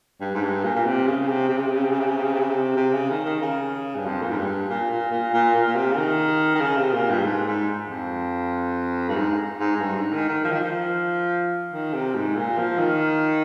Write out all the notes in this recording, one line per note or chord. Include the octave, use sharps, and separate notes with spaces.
G2
G#2
G2
A#2
A#2
C3
C#3
C3
C3
C#3
C3
C#3
C3
C#3
C3
C#3
C3
C#3
C3
C#3
C3
C3
C#3
D#3
D#3
C#3
G2
F2
A#2
G#2
G2
A#2
A#2
A#2
A#2
A#2
A#2
C3
C#3
D#3
D#3
C#3
C3
A#2
G2
G#2
G#2
F2
G2
G#2
G#2
G#2
G2
G#2
D#3
D#3
F3
D#3
F3
D#3
C3
G#2
A#2
F3
D#3